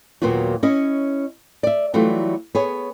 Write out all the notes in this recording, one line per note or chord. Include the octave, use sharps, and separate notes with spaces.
D#2 A#2 F#3 B3 F4 F#4
C#4 E4 C#5 D#5
D5 E5
E3 F#3 G3 A3 F4
B3 G#4 C#5